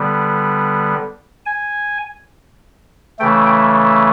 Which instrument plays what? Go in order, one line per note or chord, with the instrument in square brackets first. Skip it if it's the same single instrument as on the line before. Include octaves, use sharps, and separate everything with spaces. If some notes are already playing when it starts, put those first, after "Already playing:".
Already playing: [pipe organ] D3 G3 B3
G#5
C#3 E3 A3 G5